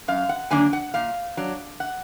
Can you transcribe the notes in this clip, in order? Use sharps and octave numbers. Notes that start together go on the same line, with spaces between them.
F#2 F5
F#5
D3 F#3 A#3 D4 G#5
F#5
A#2 F5
F#3 D4
F#5